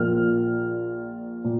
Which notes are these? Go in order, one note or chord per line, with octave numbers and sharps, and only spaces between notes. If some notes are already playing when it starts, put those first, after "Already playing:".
Already playing: A#1 A#2 F3 A#3 F4 F6
A#2